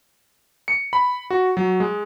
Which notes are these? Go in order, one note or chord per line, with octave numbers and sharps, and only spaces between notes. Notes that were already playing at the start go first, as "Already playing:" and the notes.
C#7
B5
F#4
F#3
G#3